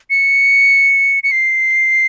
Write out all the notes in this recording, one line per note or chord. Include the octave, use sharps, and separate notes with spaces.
C#7
C#7
C7